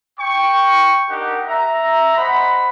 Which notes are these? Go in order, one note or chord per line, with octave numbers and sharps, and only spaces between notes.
G5 C#6
D4 D#4 G4 A#4 F#5
E5 A#5
C5 D#5 F#5 B5